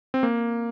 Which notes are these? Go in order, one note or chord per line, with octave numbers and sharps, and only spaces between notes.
C4
A#3